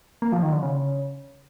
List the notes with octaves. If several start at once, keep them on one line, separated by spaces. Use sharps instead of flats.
A#3
F3
D#3
D3
C#3